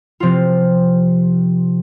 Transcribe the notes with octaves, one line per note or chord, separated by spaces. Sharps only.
C3 F3 C4 F4